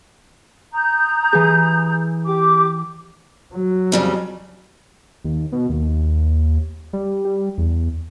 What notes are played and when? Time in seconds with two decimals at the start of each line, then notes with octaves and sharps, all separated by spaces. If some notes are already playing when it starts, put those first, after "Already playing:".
0.73 A#5 D#6 G6
1.33 E3 G#4
2.25 G4 D6
3.55 F#3
3.92 F2 C#3 G3
5.24 D#2
5.52 B2
5.69 D#2
6.93 G3
7.25 G3
7.58 E2